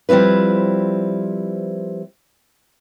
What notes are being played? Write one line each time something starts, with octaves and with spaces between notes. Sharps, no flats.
F3 G3 C4 E4 B4